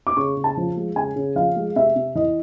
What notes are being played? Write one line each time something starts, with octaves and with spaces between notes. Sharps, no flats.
D6
C#3 C#6
C#3
A5
F3
G#3
C#3 G#5
C#3
F3 F5
G#3
C3 E5
C3
E3 D#5